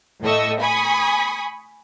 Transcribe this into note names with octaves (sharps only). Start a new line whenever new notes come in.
A2 A3 D#5 C#6 E6
G#5 B5 C#6 D#6